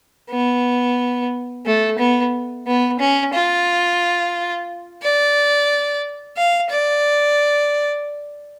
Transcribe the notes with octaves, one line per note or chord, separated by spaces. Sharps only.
B3
A3
B3
B3
C#4
F4
D5
F5
D5